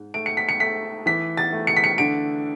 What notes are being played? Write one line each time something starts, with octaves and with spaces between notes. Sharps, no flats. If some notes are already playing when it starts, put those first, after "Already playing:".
Already playing: G#2
A3 D7
C#7
B6
C#7
A3 B6
E3 B6
A6
A3
C#7
B6
C#7
D3 D7